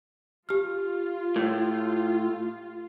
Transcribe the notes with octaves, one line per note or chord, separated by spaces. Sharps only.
F4 G4 F6
A2